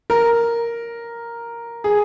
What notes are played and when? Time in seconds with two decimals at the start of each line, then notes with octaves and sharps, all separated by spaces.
0.10 A#4
1.84 G#4